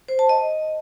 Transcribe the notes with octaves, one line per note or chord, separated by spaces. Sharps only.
C5
A5
D#5